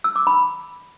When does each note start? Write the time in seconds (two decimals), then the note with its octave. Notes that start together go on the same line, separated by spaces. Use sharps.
0.04 E6
0.16 D6
0.27 B5